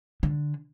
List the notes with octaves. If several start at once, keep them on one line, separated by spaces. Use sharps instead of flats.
D3